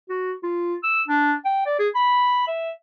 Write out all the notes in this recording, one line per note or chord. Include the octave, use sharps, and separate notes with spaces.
F#4
F4
E6
D4
G5
D5
G#4
B5
E5